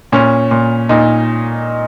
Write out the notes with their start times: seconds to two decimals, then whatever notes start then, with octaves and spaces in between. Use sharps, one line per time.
0.12 A#2 C#4
0.51 A#2
0.89 A#2 D#4